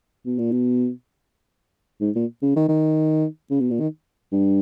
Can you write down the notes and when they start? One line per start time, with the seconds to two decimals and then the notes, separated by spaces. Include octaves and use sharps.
0.26 B2
0.38 A#2
0.52 B2
2.01 G#2
2.15 A#2
2.42 C#3
2.56 D#3
2.68 D#3
3.51 C#3
3.60 B2
3.71 A#2
3.80 D#3
4.32 G2